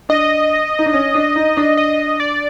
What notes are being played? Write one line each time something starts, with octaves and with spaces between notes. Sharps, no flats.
D4 D#5
D#4
D4
C#4
D4
D#4
D4
D#5
D5